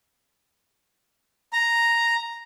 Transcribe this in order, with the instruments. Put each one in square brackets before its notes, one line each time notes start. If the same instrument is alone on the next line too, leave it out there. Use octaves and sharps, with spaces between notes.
[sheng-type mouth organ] A#5